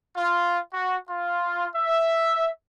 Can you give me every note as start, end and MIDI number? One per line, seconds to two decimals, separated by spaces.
0.16 0.59 65
0.74 0.96 66
1.09 1.69 65
1.76 2.48 76